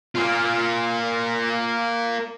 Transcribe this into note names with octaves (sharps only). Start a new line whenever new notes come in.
A#3 F4